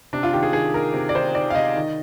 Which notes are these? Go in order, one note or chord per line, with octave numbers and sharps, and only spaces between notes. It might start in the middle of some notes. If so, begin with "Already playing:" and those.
C3 D4
F4
D#3 G4
G#4
D#3 G#4
D#3 A#4
C3
D5
D#3 C5
D#3 D5
F5
C3 D#5
D#3